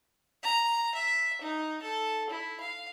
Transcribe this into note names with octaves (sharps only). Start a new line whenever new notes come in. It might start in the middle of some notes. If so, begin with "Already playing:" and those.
A#5
E5
D#4
A4
E4
F5